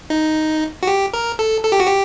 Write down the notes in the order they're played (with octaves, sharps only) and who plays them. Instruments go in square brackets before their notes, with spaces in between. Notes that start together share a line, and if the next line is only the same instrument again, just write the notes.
[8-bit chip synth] D#4
F#4
G4
A#4
A4
A4
G4
F#4
G4